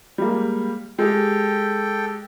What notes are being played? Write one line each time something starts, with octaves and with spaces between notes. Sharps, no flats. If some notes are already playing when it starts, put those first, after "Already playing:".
G3 G#3 A#3
G#3 G4 A4 G5